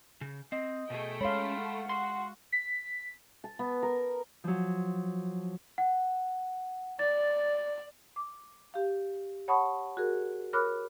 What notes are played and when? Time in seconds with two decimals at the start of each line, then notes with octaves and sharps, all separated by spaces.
0.21 C#3
0.52 C4 D#5
0.90 B2 A3 G#4 G5
1.21 G#3 C#4 F5 B5 C6
1.58 F#5
1.89 F#4 C6
2.52 B6
3.44 A5
3.59 B3
3.82 A#4
4.44 F3 F#3
5.78 F#5
6.99 D5 A6
8.16 D6
8.74 G4 F5
9.48 C#5 F#5 A5 B5 C#6 D#6
9.97 F#4 G#4 A#4
10.53 A#4 C#5 B5 D6 F6 F#6